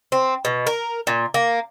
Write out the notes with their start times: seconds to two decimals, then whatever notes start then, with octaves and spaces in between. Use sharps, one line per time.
0.12 C4
0.45 B2
0.67 A#4
1.07 A#2
1.34 A#3